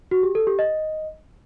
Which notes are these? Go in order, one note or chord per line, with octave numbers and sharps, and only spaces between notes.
F#4
G4
A4
G4
D#5